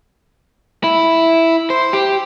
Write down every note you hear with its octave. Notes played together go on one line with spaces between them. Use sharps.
E4
C5
G4